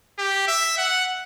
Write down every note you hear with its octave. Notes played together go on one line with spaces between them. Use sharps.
G4
E5
F#5